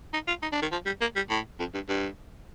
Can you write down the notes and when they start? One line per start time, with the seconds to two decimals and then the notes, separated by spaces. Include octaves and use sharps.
0.13 D#4
0.28 F4
0.42 D#4
0.52 D4
0.62 D#3
0.72 F3
0.86 G3
1.01 A#3
1.16 G3
1.30 A2
1.59 F2
1.74 G2
1.89 G2